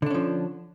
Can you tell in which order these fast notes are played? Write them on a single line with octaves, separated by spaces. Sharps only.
D3 D4 C#4 F3